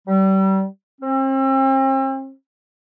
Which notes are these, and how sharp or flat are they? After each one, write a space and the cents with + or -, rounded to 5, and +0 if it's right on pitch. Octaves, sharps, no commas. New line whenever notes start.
G3 -30
C4 +40